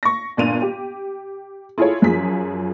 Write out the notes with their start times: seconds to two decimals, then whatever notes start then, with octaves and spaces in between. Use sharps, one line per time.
0.03 C#6 A#6
0.37 G1 A#2 D4 D#7 F7
0.62 G4
1.78 E4 F4 G#4 A4 C#5
2.02 F#2 F3 G#4 B6